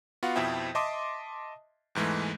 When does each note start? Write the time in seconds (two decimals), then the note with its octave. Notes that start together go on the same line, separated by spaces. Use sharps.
0.23 B3 F4 F#4 F5 F#5
0.36 F2 B2 F3 E4 E5 G5
0.75 D#5 E5 A5 C6 D6 D#6
1.95 E2 G#2 E3 G#3 A3